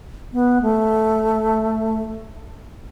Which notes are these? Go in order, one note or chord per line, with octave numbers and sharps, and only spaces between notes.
B3
A3